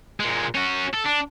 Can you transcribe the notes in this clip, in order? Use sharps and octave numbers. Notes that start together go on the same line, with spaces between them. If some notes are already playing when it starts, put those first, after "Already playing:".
A#2 G#3
C#4 F#4
A4
D4